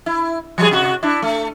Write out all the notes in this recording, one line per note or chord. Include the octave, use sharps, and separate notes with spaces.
E4
F3 G3 G#4
C3 F#4
D4 E4
A3